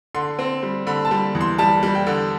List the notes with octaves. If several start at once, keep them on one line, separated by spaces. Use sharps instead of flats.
D3 C6
C4
G3
D3 B5
A5
G3
E2
C6
G3 A5
G3
G5
D3